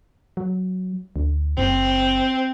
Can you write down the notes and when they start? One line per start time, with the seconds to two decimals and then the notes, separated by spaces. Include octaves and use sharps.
0.37 F#3
1.16 D2
1.57 F#1 C4